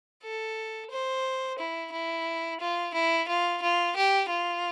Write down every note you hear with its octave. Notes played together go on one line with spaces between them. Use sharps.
A4
C5
E4
E4
F4
E4
F4
F4
G4
F4